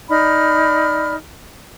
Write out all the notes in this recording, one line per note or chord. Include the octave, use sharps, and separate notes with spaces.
D#4 D5 B5 F6